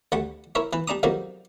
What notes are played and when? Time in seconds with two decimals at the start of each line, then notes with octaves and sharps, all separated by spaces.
0.12 D2 G3 A3 F#5
0.55 E4 A#4 C#5 E5
0.73 E3 B4
0.88 G3 D4 A#5 D#6
1.03 F2 C3 D#3 F#3 G3 A#3